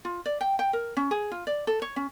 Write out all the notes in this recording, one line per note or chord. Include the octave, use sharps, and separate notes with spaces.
F4
D5
G5
G5
A#4
C#4
G#4
F4
D5
A4
C#5
C#4